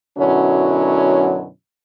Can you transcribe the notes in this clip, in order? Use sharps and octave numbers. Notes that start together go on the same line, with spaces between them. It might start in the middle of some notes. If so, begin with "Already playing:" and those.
F#2 B2 D3 F#3 C#4 E4